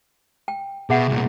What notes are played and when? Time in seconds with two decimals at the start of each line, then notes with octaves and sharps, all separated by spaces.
0.48 G5
0.90 B2 G#4 E5 F#5
1.08 C2 A#2